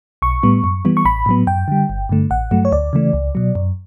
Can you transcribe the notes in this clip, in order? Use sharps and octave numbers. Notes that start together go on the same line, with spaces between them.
B1 C#6
A2 G3 B3
F#2
E3 G3 B3
C#6
A1 B5
A2 F#3 B3
F#2 G5
D3 G3
G1
G2 D3 A3
A1 F#5
G2 F#3 A3
C#5
D2 D5
C#3 E3 A3
C#2
B2 F#3
F#2